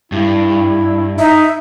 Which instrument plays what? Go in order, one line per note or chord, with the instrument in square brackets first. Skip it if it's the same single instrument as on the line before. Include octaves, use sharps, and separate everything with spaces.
[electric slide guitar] G2 [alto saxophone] E4
[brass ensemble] D#4 [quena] E5